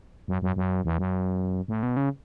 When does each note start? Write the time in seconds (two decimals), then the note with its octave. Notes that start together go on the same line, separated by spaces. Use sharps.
0.28 F#2
0.42 F#2
0.56 F#2
0.85 E2
0.98 F#2
1.68 A2
1.83 B2
1.97 C#3